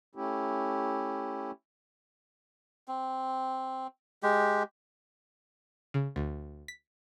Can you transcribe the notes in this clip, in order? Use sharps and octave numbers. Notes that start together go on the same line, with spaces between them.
A3 C#4 E4 G4
C4
G#3 G4
C#3
D2
B6